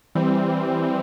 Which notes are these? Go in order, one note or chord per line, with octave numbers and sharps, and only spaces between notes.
E3 G3 C4